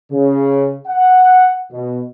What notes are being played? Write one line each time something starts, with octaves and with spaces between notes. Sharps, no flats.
C#3
F#5
B2